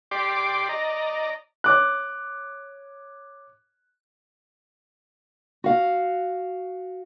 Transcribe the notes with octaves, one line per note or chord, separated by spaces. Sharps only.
G4 D5 C6 D6
D5 D#5 A#5
C#5 D6 F#6
F#4 F5